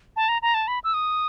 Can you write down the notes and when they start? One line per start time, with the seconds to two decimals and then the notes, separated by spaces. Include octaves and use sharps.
0.16 A5
0.29 A#5
0.42 A#5
0.54 A5
0.68 B5
0.84 E6
0.94 D#6